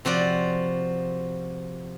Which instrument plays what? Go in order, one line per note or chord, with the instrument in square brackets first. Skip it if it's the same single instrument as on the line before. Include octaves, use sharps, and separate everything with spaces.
[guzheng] C3 F3 F#4 D5